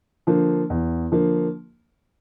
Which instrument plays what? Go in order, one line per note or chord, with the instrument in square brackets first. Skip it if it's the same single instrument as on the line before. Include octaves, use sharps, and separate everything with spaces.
[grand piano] D3 F3 A#3
E2
D3 F3 A#3